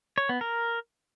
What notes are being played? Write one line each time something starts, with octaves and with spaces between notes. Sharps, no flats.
C#5
B3
A#4